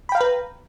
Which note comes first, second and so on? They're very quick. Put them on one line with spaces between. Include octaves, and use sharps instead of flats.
B5 G5 F5 A#5 B4